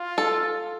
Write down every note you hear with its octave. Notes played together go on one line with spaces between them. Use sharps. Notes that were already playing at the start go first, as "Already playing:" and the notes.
Already playing: F4
A4